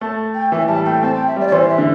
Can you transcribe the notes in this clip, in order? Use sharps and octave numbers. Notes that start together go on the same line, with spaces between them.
A3 A5
G5
E3 E5
G3 A5
A3 G5
C4 A5
G5
E5
G3 D5
D5
E3 C5
E5
D3